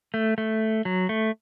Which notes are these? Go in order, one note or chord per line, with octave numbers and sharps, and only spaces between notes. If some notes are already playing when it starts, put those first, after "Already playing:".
A3
A3
F#3
A3